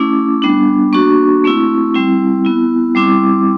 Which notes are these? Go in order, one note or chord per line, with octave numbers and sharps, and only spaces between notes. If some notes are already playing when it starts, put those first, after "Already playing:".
Already playing: A3 C#4 E4 D6
G3 B3 D4
A#3 D4 F#4 C#6
A3 C4 E4
G3 C4 E4
B3 E4
G3 C4 E4 D6